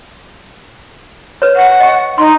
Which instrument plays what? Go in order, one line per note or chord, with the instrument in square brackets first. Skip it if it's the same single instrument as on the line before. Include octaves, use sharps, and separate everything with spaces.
[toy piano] B4 C#5
[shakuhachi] F#5
[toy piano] D#5 C#6
[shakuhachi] D#4 [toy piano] C6